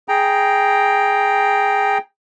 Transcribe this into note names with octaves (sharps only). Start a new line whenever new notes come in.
G#4 G5 A#5